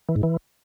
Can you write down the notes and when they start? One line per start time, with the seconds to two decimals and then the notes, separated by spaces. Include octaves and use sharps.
0.09 E3
0.16 G#2
0.23 E3